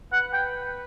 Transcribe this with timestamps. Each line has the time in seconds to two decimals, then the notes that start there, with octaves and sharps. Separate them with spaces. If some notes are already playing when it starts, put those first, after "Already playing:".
0.13 B4 F#5
0.33 G5